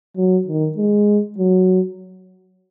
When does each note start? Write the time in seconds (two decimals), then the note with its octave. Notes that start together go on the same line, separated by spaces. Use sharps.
0.17 F#3
0.47 D#3
0.77 G#3
1.38 F#3